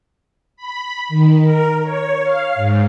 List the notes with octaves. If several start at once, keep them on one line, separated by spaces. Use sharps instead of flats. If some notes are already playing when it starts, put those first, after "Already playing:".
B5
D#3
A#4
C#5
F5
G#2